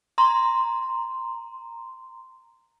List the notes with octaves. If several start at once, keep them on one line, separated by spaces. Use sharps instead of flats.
A#5 C6